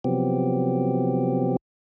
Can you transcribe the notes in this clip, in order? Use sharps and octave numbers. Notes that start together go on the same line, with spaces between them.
C3 F3 F#3 B3 C4 G4